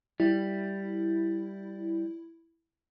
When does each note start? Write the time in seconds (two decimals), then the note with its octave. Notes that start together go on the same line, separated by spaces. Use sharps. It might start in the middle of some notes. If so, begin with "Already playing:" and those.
0.20 G3 E4